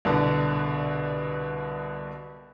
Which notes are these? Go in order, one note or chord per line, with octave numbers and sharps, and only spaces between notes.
C2 B2 D3